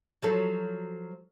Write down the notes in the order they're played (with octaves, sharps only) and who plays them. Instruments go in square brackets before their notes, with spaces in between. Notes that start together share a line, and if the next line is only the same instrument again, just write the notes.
[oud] F3 F#3 A4